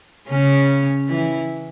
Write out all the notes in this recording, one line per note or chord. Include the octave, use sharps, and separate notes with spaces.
C#3 C#4
E3 E4